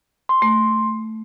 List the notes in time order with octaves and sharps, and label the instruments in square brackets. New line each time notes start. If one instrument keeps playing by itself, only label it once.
[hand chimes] C6
[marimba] A3